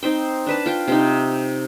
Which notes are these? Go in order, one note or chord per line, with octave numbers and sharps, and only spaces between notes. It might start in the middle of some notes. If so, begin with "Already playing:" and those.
C4 D#4 C5 G5
D4 B4 A5
F4 G5
C3 C4 D#4